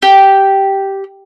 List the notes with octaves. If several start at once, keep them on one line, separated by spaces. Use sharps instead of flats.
G4